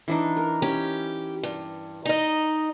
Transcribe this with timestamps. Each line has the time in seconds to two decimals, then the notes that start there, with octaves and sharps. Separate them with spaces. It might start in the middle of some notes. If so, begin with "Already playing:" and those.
0.08 E3 D4 D#4
0.37 A#4
0.62 C#4 G4
1.43 G2
2.05 D#4 D#5